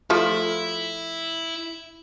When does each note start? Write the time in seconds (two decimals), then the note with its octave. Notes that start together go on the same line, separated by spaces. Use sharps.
0.10 F3 A3 E4